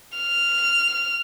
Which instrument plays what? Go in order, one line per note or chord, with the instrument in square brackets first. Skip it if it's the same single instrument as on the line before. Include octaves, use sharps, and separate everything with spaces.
[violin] F6